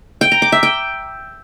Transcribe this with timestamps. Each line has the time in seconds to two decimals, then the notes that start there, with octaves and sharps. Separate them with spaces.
0.21 G5
0.32 A#5
0.42 D6
0.52 E5
0.63 G5